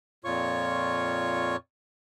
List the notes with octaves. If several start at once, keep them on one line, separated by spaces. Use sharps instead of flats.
F2 A#2 F4 C#5 C#6